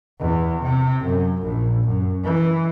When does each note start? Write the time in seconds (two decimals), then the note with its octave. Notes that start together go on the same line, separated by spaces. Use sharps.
0.19 E2
0.63 C3
1.05 F#2
1.43 A#1
1.87 F#2
2.24 E3